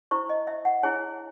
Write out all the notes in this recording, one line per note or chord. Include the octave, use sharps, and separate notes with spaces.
E4 C5 C#6
D#5
E5
F#5
E4 G#4 C#5 G#5